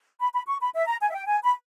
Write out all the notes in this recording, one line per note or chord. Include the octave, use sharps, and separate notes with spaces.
B5
B5
C#6
B5
E5
A#5
G#5
E5
G5
G#5
B5